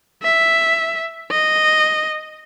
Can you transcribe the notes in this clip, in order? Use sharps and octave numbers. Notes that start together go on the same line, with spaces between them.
E5
D#5